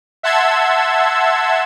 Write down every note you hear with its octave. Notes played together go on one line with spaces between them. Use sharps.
E5 F#5 A5 C6 E6 G#6